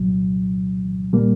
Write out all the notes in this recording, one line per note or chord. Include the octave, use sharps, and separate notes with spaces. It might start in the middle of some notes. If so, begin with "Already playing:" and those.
Already playing: C2 A#2 F#3
A#2 G3 A#3